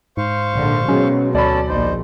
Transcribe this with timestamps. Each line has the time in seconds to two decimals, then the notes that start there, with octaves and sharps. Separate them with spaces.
0.17 G#2 C5 F5 C#6
0.55 A#1 D3
0.89 B2 F#3 G#3 C#4
1.35 D2 C#4 A4 D5 B5
1.68 A#1 D#4 C5